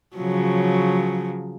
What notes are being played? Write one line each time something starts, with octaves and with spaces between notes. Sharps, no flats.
C#3 F3 F#3